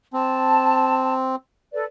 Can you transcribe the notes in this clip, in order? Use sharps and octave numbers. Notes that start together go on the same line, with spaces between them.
C4 A5
A4 B4 D5